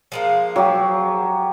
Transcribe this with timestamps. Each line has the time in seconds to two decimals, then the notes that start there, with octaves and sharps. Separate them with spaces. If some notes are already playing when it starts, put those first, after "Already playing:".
0.12 F3 G#3 A#3
0.56 F#3 G4